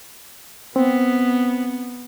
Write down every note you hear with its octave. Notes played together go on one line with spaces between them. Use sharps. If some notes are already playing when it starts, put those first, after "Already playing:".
B3 C4